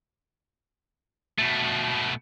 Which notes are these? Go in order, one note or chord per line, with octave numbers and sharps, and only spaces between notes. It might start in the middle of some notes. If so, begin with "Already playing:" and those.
B2 A3